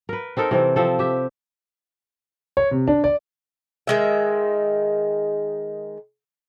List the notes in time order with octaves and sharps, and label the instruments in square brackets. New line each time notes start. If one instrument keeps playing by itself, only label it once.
[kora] A#4 B4
C4 D#4 A4 A#4
C3 E3 C4
F3 C4 A4
G4 E5
[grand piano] C#5
C3
D4
D5
[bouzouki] D#3 G#3 E5